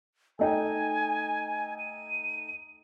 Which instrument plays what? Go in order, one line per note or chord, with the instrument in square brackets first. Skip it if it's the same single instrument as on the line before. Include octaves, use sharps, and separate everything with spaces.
[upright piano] A3 D#4 G5 [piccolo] G#5
[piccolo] D#7